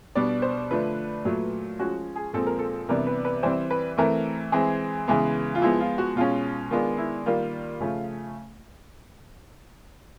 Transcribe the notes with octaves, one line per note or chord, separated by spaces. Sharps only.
B2 G3 B3 D4 D5
C5
D3 F3 A3 D4 B4
A#2 F#3 A3
F3 G#3 C#4 F#4
G#4
A#2 F3 G#3 C4 A4
A#4
A4
C3 E3 G3 B3 D4 A#4
B4
B4
E3 G3 C4 C5
B4
E3 A3 C4 A#4
E3 G#3 C4 G#4
C#3 E3 G#3 B3
F4
F3 G#3 B3 E4
F4
F#4
B2 G#3 C#4 F4
D#3 G#3 B3 D4 F4
E4
D#3 G3 A#3 F4
C#3 F3 A3 C#4